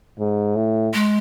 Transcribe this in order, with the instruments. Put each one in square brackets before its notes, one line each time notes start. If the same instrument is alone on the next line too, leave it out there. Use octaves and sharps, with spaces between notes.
[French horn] G#2
A2
[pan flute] G#3